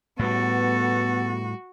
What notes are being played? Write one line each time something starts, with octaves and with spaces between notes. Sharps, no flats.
A2 G3 B3 F#4 A4